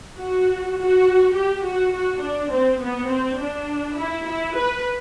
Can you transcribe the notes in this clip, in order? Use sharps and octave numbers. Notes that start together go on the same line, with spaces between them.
F#4
F#4
G4
F#4
F#4
D4
C4
B3
C4
D4
E4
E4
B4